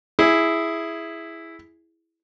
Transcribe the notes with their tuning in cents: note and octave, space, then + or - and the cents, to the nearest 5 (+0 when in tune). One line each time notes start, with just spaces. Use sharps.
E4 +0 G#4 +0